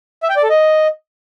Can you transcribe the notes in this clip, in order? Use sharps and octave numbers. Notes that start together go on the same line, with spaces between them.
E5
G5
D5
A4
D#5